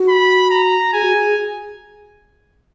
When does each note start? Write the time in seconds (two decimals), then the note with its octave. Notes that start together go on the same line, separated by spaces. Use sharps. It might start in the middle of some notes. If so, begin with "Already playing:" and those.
Already playing: F#4
0.09 B5
0.50 A#5
0.93 G#4 G#5
1.04 F#4
1.14 G#4